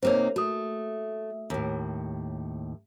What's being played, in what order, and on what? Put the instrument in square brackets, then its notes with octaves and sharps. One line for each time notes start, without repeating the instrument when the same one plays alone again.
[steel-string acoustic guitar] C3 A#3 D#4 [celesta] C5 C#5
[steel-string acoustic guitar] A3 [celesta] F#4 D#6
[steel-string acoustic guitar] D#2 A2